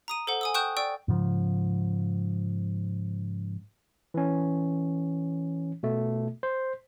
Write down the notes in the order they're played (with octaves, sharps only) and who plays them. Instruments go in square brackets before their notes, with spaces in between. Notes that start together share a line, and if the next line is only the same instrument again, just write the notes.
[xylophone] A#5 D#6 D#7
A4 C5 F#5
G#5 D#6 E6
G5 C#6 D#6 F#6 G6 E7
D5 G5 C#6 E6
[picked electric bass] G#2 C#3 F3
[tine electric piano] E3 C#4
B2 A3
C5